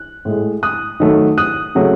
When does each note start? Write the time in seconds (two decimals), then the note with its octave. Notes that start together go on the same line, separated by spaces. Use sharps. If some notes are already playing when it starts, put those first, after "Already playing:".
Already playing: F#6
0.25 A2 G#3
0.63 D#6 F#6
1.00 D#3 F#3 A3
1.38 D#6 F#6
1.75 C#3 F#3 A3